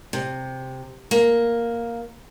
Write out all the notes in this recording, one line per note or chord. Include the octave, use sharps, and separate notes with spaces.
C3
A#3